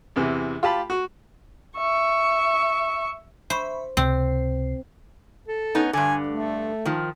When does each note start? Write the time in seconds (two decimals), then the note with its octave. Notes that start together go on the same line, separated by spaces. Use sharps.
0.16 E2 C3 E3
0.63 F4 G4 A5 B5
0.90 F#4
1.77 E5 C#6
3.50 C5 E5 B5 C#6
3.97 C#2 C3 C4 C7
5.48 A4
5.75 B3 C#4 D#4
5.93 G2 D3 G#5
6.28 A3
6.85 D#3 F3